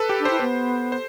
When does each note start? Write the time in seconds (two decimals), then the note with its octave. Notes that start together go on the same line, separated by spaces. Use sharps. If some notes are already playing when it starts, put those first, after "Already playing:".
Already playing: A4 B4
0.09 G4
0.19 D4
0.25 C5
0.30 E4
0.40 B3 C5
0.92 C5